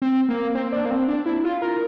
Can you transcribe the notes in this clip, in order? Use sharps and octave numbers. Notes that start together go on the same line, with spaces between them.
C4
A#3
C4
D4
A#3
C4
D4
E4
F4
A#4